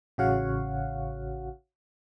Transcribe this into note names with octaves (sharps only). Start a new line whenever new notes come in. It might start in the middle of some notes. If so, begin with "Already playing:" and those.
A1 C#3 F#4 C#5 F5 F#5